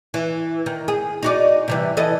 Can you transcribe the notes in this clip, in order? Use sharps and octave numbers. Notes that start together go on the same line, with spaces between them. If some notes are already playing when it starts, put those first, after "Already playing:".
E3
D#3
G#4
D#4 F#4 D5
C3 E3 G3
E3 A4 D#5